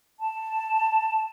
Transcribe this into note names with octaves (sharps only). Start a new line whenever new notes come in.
A5